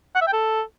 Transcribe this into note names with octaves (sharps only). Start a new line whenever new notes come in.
F#5
E5
G5
A4